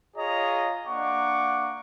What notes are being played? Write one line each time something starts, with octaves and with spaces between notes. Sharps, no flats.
F4 G#4 C#5 D#5 A#5
A#3 D4 F#5 C#6 D6